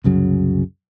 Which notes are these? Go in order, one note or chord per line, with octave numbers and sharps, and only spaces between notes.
C2 F#2 C#3 F#3